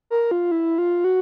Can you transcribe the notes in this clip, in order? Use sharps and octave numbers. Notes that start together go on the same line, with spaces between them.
A#4
F4
E4
F4
F#4